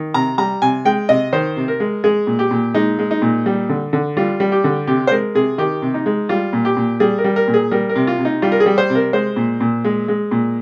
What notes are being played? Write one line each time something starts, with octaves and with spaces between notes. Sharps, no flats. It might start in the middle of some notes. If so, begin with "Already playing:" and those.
Already playing: D#3
C3 A#5
G3 A#5
C3 G#5
G#3 G5
C3 D#5
D#3 C5
C3
A#4
G#3
G#3 G#4
A#2
G4
A#2
G#3 D#4
G#3
D#4
A#2
G3
D3
D3
G3 F4
G3
G4
D3
C3 G4
C5
G#3 A#4
C3 G#4
D#3 G4
C3
D#4
G#3
G3 F4
A#2
G4
A#2
G3 G#4
A#4
G3
A#4
A#2
G#4
G3 A#4
A#4
C3
F4
C3
D#4
G3 F4
A#4
G#4
G3
C5
C3
A#4
G#3 C5
A#2
A#2
G#3
G#3
A#2